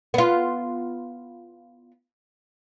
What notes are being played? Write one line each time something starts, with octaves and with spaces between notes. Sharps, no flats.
B3 F4